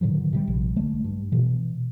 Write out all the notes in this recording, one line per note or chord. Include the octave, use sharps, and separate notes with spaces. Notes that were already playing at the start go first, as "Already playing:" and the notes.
A2 D3 D#3 F#3
C3 E3 G3
A#1
D3 G#3 A3
G2
B2 E3